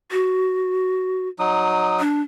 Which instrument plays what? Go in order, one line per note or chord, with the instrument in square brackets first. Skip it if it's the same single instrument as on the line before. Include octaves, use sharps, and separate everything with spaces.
[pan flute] F#4
[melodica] F#3 D#4 D#6
[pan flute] D4